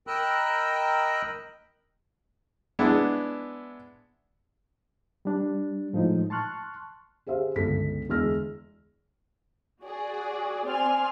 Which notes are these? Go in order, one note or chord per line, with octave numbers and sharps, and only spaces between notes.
A#4 D#5 G5 B5 E6 F#6
G#3 B3 D4 E4
G3 D4
A2 F3 G#3 D#4
A5 C6 C#6 F6 F#6
G4 G#4 C5 E5 F5
G1 C#2 A4 B6
E2 D3 G#3 E6 F6 A#6
F#4 G#4 D5
C4 D5 G#5 C6 F6